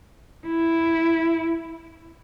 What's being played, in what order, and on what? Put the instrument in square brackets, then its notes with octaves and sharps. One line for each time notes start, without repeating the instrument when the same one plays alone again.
[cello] E4